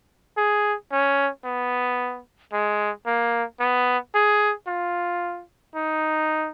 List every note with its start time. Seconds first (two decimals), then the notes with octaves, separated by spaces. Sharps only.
0.37 G#4
0.92 C#4
1.45 B3
2.53 G#3
3.06 A#3
3.60 B3
4.15 G#4
4.67 F4
5.75 D#4